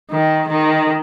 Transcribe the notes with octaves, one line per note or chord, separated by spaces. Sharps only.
D#3
D#3